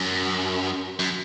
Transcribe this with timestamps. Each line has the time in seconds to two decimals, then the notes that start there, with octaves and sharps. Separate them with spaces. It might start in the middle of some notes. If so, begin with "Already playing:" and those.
Already playing: F#2
0.99 F#2